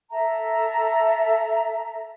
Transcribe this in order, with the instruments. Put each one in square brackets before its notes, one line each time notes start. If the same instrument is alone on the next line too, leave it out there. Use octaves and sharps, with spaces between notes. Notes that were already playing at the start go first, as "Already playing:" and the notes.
[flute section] A4 E5 A5 A#5